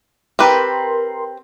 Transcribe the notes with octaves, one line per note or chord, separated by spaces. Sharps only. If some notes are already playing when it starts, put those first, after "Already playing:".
C4 G4 A#4 B4 C6